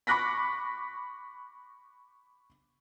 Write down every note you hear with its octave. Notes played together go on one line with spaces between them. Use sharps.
B5 C#6 D6 F#6 A#6 B6